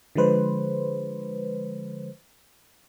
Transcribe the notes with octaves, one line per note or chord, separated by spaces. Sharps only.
D3 F3 G#3 B4 C5